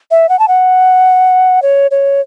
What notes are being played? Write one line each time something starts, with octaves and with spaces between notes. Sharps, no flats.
E5
F#5
A5
F#5
C#5
C#5